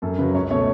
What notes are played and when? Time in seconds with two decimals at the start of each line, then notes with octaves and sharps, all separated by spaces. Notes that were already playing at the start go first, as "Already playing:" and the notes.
0.02 F#2 A4
0.18 C#3 B4
0.22 F#3
0.35 C#2 C#5
0.51 B2 A3 C#5